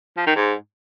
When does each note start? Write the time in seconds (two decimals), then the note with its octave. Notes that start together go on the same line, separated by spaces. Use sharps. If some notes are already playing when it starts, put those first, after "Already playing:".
0.17 F3
0.26 D#3
0.36 G#2